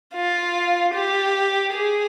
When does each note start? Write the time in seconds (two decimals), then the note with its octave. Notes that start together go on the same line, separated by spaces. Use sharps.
0.14 F4
0.94 G4
1.73 G#4